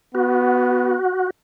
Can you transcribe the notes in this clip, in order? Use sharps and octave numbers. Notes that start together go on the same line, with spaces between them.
B3 F#4